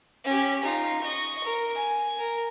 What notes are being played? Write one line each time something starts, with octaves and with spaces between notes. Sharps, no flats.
C#4 G4
D#4 F4
D#5 C#6
A#4
G#5
A#4